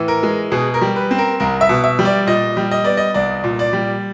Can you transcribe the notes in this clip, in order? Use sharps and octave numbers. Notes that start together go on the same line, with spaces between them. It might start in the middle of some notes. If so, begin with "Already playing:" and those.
Already playing: A2 E3
A#4
G#3
B2 G#4
A#4
G3
B4
C4
A#4
C2 A#4
E5
B2
E5
G3
D5
A#2 D#5
G3
D#5
B3 D5
D#5
C2 D5
A#2
D5
G3